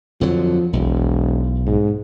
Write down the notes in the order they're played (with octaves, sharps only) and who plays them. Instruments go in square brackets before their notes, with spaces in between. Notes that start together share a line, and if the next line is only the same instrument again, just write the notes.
[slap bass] F2 D3 F#3 [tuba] F3
[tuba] E1 [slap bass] B1
[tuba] G#2